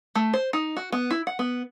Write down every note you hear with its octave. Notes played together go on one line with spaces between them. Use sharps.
A3
C5
D#4
F#4
B3
E4
F#5
B3